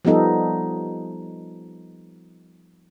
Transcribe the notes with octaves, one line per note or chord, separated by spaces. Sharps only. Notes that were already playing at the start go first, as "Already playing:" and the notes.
F3 G3 B3 D#4 A4